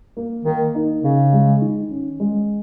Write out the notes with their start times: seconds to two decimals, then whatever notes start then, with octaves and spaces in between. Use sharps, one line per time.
0.17 A#3
0.45 D#3 A#3
0.75 D#4
1.03 C#3 C#4
1.33 G#3
1.62 D#3
1.91 C#4
2.20 G#3